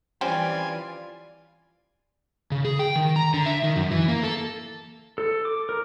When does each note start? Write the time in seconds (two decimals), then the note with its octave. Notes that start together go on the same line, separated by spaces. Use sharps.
0.21 E3 G3 C4 C#4 F4 D5 G#5
2.52 C#3
2.65 G#4
2.79 G5
2.96 D#3
3.16 A#5
3.34 D3
3.46 E5
3.64 D#3
3.76 F#2
3.91 E3
4.08 A#3
4.23 A4
5.18 A4
5.45 D6
5.69 A#4